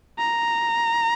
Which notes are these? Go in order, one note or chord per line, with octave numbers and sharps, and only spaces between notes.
A#5